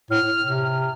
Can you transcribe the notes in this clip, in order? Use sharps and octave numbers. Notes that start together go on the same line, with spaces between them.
A2 F6
C3